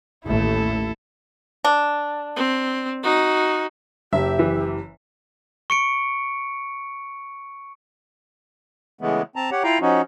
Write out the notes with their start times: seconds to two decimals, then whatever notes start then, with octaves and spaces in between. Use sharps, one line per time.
0.25 A1 D#2 A3 E4 A4
1.64 D4
2.37 C4
3.04 D#4 F#4
4.13 F#1 G4 E5
4.39 E3
5.70 C#6 C#7 D7
9.01 C#3 E3 G#3 A3 B3
9.36 C4 A5 A#5
9.51 G4 C#5 F#5
9.64 E4 F4 F5 G5 A#5
9.81 F3 C#4 D#4 F#4